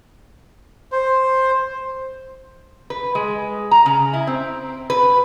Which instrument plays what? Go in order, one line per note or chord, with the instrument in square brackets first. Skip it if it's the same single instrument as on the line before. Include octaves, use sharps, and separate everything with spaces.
[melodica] C5
[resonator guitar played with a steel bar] B4
G#3
A#5
C#3
E4
C4
B4